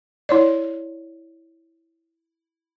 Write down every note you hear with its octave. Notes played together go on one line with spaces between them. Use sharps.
E4 C#5 D5